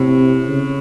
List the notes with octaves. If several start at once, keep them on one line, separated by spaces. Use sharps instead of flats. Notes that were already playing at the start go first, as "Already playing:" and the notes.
Already playing: A2 C3
C#3